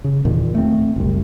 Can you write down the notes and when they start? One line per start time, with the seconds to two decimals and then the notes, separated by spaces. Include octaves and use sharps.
0.04 C#3
0.25 E2 A#2 D#3
0.55 A3 C4
0.96 F#1 C2